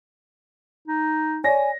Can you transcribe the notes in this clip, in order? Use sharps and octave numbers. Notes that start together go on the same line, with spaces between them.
D#4
C#5 D5 G#5 A#6